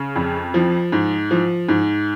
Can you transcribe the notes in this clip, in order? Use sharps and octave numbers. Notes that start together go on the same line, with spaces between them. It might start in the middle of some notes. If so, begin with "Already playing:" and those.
Already playing: C#3
F2
F3
G#2
F3
G#2